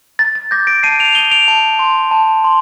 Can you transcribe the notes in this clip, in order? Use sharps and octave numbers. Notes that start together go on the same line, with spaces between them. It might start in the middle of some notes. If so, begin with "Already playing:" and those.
A#5 A6
A6
D6 G6 A#6
A#6 D7
A5 C7 D#7
D7 F7
D#6 D#7 G7
D7 F7
A5
C6
A5
C6